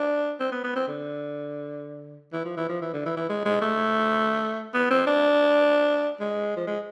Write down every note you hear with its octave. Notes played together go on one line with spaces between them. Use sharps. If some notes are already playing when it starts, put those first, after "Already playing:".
Already playing: D4
C4
B3
B3
C4
D3
E3
F3
E3
F3
E3
D3
E3
E3
G#3
G#3
A3
B3
C4
D4
G#3
F3
G#3